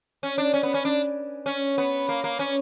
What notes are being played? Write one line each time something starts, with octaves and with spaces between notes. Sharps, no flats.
C#4
D4
C#4
B3
C#4
D4
C#4
B3
A#3
A#3
C#4